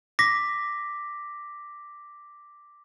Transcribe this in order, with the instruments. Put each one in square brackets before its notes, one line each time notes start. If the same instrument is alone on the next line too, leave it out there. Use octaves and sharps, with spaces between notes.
[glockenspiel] D6 A#6 B6